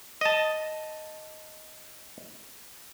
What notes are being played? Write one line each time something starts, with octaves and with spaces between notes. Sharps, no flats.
D#5 A5